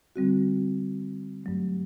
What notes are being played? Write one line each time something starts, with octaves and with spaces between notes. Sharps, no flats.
D3 G3 C4 F#4
G2 F#3 A3